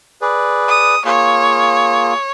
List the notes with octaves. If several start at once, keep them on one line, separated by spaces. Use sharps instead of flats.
G#4 B4 D5
D#6
A#3 F4 G#4 C#5